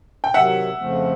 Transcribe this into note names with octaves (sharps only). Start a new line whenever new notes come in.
G5
C3 D#3 F#3 E5 F#5
F2 C#3 F3 A3 C4